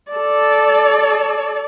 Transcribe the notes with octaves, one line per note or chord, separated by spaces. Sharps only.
A4 D5